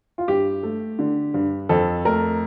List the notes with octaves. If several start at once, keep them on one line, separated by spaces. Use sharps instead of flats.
F4
G2 G4
A3
D3
G2
F2 A4
A3 A#4